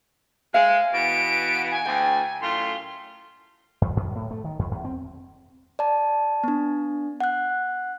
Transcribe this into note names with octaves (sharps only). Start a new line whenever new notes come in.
G#3 F5
B2 E3 B3 D7
G#5
D2 G5
F#2 A2 F4 C6
F2
F#2
A2
A3
D#3
F2
E2
C4
D5 A5
B3 D4
F#5 F#6